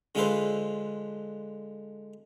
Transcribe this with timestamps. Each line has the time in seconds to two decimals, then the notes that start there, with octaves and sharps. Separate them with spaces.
0.15 D3 G#3 F4 A4 B4 C5